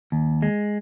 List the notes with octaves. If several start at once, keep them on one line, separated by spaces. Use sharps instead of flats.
D#2
G#3